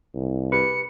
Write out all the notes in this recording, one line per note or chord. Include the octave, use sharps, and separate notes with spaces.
C2
G4 G#4 B4 C#7